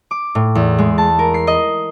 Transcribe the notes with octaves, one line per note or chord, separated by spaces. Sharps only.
D6
A2
E2
G#3
A5
A#4
C7
D#5